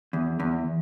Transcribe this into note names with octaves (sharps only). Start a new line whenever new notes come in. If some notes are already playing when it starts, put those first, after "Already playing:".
E2
E2